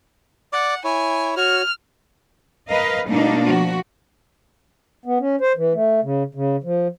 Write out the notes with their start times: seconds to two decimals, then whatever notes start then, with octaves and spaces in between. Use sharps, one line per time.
0.53 D5 F#5 D6
0.85 E4 C#5 G#5
1.37 F#4 C#5 F6
2.68 A#4 B4 D#5 F5
3.09 B2 G3 A3 A#3 D4 D#4
3.42 F3 F#4
5.06 B3
5.20 C#4
5.41 C5
5.57 E3
5.74 A3
6.03 C#3
6.35 C#3
6.64 F3